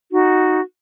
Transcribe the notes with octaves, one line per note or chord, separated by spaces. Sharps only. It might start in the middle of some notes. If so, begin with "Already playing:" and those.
D#4 F#4